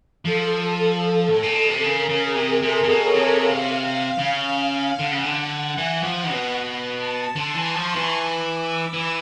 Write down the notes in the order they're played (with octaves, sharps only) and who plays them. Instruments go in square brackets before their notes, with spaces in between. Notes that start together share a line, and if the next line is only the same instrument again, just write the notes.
[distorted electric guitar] F3 [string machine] A4
[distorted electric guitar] A2
A#2
B2
C3
[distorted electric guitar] C#3 [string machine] A#4
[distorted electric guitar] C#3
[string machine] G#4
[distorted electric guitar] C3
[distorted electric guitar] C3 [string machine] A4
[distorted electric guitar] C3
B2
[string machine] C#5
[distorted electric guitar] C3
[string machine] F5
[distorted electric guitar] C#3
[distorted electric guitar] D3 [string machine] F#5
[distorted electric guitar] C#3
D3
[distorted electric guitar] E3 [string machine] F#5
[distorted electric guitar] F3
B2
[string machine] A5
[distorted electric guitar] D3 [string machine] C6
[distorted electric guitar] E3
[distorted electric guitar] F3 [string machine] C#6
[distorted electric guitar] E3
[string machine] D6
E6
[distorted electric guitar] E3